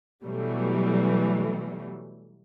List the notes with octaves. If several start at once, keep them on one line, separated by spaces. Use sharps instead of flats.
B2 E3 F#3 G3 A3